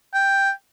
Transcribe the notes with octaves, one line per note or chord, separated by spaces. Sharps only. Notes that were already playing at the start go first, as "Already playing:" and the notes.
G5